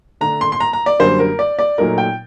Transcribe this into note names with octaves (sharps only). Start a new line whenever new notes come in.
D3 A3 D4 A#5
C6
C6
A#5
A#5
D5
F#2 D3 G3 A#3 C5
A#4
D5
D5
A#2 F#3 A3 D#4 A#4
G5